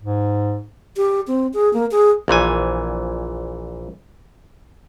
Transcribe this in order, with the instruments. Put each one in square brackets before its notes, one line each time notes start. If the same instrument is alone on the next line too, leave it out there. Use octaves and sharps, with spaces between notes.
[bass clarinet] G#2
[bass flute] G4
C4
G#4
A#3
G#4
[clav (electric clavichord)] A#1 A#2 E3 G#5